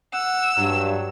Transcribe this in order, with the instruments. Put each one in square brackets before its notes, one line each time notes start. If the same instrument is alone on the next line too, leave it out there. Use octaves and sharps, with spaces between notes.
[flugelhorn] F#5 [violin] E6
[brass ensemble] G2 [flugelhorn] F#3